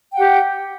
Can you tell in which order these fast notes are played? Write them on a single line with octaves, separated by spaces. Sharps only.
G5 F#5 G4